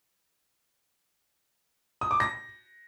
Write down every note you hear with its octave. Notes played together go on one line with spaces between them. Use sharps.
D#6
D6
A#6